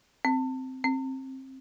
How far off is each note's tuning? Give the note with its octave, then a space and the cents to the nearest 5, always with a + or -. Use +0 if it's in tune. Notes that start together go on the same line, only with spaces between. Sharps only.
C4 -5
C4 +20